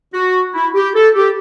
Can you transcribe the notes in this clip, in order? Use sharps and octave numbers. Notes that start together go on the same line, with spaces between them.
F#4
E4
G4
A4
G4